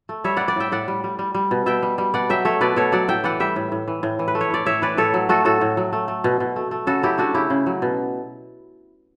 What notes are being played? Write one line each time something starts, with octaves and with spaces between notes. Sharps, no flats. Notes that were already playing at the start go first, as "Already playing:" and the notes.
A3
G3 C#5 E5
G3 D5 F#5
D5 F#5
A2 E5 G5
A2 D5 F#5
G3
G3
G3
G3
B2
B2 E5 G5
G3
G3
B2 D5 F#5
F#3 E5 G5
A3 C#5 E5
B2 B4 D5
B2 A4 C#5
F#3 D5 F#5
A2 E5 G5
E3 D5 F#5
G3 E5 G5
A2
A2
E3
A2
E3
B4
A3
C#5
A2 D5
A2 C#5 E5
E3 B4 D5
A2 A4 C#5
F#3
A3 F#4 A4
A2 F#4 A4
A2
F#3
A3
A3
B2
B2
A3
A3
C#3 F#4 A4
F#3 E4 G4
A3 D4 F#4
C#3 E4 G4
C#3
F#3
B2